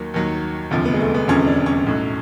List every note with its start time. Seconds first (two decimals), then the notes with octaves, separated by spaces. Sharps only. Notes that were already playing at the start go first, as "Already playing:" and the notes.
Already playing: D#2 D#3 F#3 A#3
0.14 D#2 D#3 F#3
0.71 E1 D2 C3 F3
0.85 B3
0.94 G#3
1.00 A3
1.14 B3
1.28 E1 D2 C3 F3 C#4
1.47 D4
1.66 C#4
1.86 B1 A2 F#3